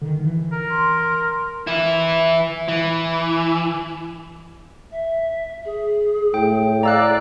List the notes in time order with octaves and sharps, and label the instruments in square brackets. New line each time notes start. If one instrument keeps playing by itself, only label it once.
[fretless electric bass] D3 D#3
E3
[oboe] A#4
[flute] C6
[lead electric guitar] E3 E4
E3
[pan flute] E5
G#4
[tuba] A2 [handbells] G5
[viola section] D5 [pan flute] F5 [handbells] A#5 E6 F#6